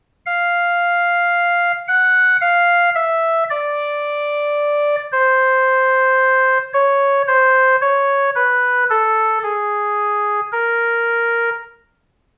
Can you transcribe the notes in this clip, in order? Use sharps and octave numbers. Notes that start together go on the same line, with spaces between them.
F5
F#5
F5
E5
D5
C5
C#5
C5
C#5
B4
A4
G#4
A#4